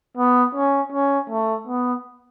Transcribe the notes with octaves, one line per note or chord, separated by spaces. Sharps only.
B3
C#4
C#4
A3
B3